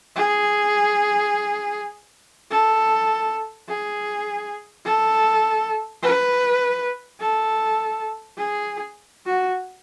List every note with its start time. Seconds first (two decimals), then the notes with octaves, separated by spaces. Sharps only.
0.16 G#4
2.51 A4
3.68 G#4
4.85 A4
6.03 B4
7.20 A4
8.37 G#4
9.26 F#4